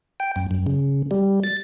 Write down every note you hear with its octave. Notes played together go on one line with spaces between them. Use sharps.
G5
F#2
F#2
C#3
G3
A6